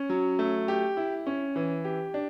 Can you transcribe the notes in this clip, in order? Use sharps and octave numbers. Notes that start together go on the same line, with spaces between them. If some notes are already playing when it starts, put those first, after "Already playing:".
Already playing: C#4
F#3
A3
G4
E4
C#4
E3
G4
D4